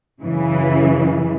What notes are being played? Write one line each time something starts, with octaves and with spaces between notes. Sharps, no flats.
F#2 C#3 E3